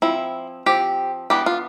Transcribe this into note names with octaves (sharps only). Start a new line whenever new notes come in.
F3 C4 E4
F3 C4 G4
E3 B3 D4 G4
F4